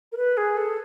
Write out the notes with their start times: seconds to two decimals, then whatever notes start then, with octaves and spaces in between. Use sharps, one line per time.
0.12 A#4
0.17 B4
0.37 G#4
0.57 A4